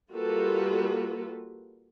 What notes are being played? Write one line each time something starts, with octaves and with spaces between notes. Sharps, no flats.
G3 A#3 F4 F#4 A4 B4